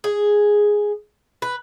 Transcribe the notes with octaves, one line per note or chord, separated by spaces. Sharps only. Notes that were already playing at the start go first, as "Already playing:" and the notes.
G#4
B4